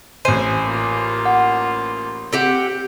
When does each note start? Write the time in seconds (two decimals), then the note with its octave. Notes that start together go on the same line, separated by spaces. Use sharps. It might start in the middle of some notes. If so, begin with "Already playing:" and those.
0.25 A1 C5 G#5
0.65 A#3 F4
1.25 F#5
2.33 C4 G4 F#5 G5